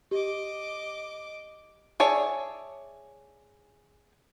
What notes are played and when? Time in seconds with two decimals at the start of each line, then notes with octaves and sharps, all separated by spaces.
0.11 G4 D#5 D6
2.00 G#4 C#5 D5 E5 A5